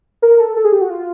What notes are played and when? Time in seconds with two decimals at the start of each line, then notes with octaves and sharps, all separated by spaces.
0.22 A#4
0.40 A4
0.56 A4
0.65 G#4
0.72 G4
0.81 F#4
0.90 F4